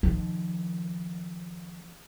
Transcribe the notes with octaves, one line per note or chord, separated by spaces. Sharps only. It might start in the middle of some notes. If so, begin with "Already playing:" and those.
D#3 F3